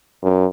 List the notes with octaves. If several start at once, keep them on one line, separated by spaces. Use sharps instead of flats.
F#2